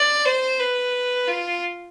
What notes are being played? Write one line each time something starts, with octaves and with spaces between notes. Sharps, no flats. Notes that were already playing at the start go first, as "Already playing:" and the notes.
Already playing: D5
C5
B4
F4